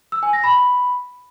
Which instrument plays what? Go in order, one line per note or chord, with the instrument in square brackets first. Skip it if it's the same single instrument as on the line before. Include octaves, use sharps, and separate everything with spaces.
[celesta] E6
G#5
A#6
B5